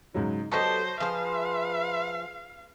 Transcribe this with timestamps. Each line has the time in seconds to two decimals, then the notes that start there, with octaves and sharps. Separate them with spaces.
0.14 G#2 C#3 F#3 D#4
0.52 F#3 B3 G4 A4 C5 D#5 A5 C#6
1.00 F3 G#4 B4 C5 F5